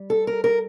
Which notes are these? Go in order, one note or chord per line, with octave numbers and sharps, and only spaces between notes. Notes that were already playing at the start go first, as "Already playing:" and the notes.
Already playing: G3
A4
A#4
A#4